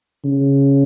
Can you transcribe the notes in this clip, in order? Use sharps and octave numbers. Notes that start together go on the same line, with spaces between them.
C#3